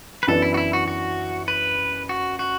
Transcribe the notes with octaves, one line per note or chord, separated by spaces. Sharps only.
B4
F#2 E3 B3 D4 A4
E4
F#4
E4
F#4
F#4
B4
F#4
F#4